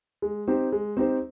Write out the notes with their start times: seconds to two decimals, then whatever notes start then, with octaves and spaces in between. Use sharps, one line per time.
0.22 G#3
0.48 C4 D#4 G4 C5
0.72 G#3
0.97 C4 D#4 G4 C5